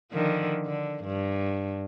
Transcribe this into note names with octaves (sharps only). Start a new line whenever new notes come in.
D3 D#3 F3
D3
G2